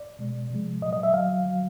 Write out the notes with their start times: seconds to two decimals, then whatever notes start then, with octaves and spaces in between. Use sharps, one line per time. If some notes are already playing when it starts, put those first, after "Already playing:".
Already playing: D5
0.19 B2 G#3
0.50 C3 F3 G#3
0.82 A#2 F#3 D#5
0.93 D#5
1.03 E5
1.14 D3 F#3 F5
1.45 D3 F#3